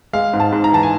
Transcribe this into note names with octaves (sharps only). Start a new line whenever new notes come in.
G#3 F5
G#2
A5
G#2
A#5
E3 A5
G#5